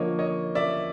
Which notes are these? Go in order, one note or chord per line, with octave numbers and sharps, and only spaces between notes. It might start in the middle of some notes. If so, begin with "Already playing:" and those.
Already playing: D3 F3 A#3 C#5 D#5
C#5 D#5
D5 E5